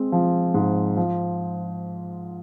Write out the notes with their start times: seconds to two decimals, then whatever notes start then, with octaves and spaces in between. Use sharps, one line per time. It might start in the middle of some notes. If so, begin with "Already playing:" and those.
Already playing: G#3 C4
0.12 F3
0.54 G#2
0.97 F3